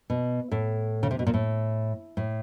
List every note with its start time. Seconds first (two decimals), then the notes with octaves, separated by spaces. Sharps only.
0.10 B2
0.51 A2
1.03 C#3
1.11 C3
1.19 B2
1.27 A#2
1.34 A2
2.17 A2